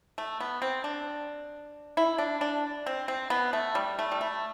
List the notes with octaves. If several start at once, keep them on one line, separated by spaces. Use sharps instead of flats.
A3
B3
C4
D4
E4
D4
D4
C4
C4
B3
A3
G3
A3
G3
A3